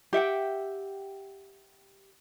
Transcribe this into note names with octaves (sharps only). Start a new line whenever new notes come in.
G4 E5 F#5 G5